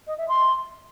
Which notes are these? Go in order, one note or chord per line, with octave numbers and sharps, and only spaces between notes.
D#5
E5
C6